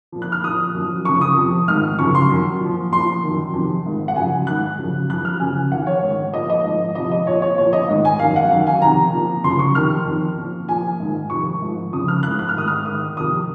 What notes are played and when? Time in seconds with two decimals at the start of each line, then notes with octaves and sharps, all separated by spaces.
0.12 A#2 F3
0.22 F#6
0.32 F6
0.44 A#2 F3 D#6
0.74 F#2 F3
1.05 F2 C#3 F3 C#6
1.21 D#6
1.36 F2 C3 F3
1.68 G#2 D#3 F6
1.99 F#2 C#3 F3 C#6
2.15 C6
2.30 F#2 D#3
2.60 A#2 F3
2.91 A#2 F3 C6
3.23 D#3
3.28 F#2
3.53 F2 C3 D#3
3.86 G#2 D#3
4.08 F#5
4.16 F#2 C#3 F3 G#5
4.47 G#2 D#3 F#6
4.79 F#2 C#3 F3
5.10 F#2 F3 F#6
5.25 F6
5.40 F#2 C#3 F3 G#5
5.72 F2 D#3 F#5
5.87 C#5
6.02 G#2 D#3
6.34 A#2 F3 D#5
6.50 D#5
6.64 G#2 F3
6.95 F2 C3 F3 D#5
7.11 D#5
7.26 A#2 F3 C#5
7.42 C#5
7.58 A#2 F3 C#5
7.73 D#5
7.88 G#2 D#3
8.05 G#5
8.19 F#2 D#3 F5
8.36 F#5
8.51 F#2 D#3 F5
8.67 G#5
8.82 F2 C3 D#3 A#5
9.13 A#2 F3
9.44 F#2 C#3 F3 C6
9.59 C#6
9.75 F2 C3 D#3 F6
10.06 F2 D#3
10.37 A#2 F3
10.68 A#2 F3 G#5
11.00 G#2 D#3
11.30 F2 C3 D#3 C#6
11.62 G#2 F3
11.92 F2 C#3 F3 D#6
12.08 F6
12.23 G#2 F3 F#6
12.39 F#6
12.49 F6
12.54 G#2 D#3 D#6
12.67 F6
12.85 G#2 D#3 D#6
13.16 F2 C3 D#3 D#6